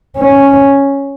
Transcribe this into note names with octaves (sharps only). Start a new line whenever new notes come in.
C#4